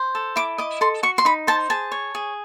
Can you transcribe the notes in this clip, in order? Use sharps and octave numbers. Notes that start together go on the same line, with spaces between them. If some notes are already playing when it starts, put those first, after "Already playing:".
Already playing: C5
A4
E4 D6
D#5 D6
A4 C6
F#4 C#6
C6
D#4 B5
C5 A5
G#4 A5
C#5
G#4